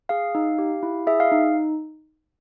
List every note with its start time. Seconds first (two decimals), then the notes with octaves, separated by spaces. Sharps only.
0.09 G#4 F5
0.35 D#4
0.58 G4
0.83 E4
1.07 G#4 E5
1.20 F5
1.32 D#4